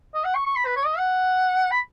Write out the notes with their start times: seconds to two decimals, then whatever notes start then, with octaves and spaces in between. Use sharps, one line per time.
0.15 D#5
0.24 F#5
0.35 C#6
0.46 C#6
0.56 B5
0.66 B4
0.76 C#5
0.86 D#5
0.98 F#5
1.71 B5